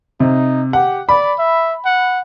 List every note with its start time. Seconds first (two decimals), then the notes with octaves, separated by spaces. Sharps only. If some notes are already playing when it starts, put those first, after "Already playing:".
0.20 C3 D#4
0.73 G4 F#5
1.09 D5 B5
1.39 E5
1.85 F#5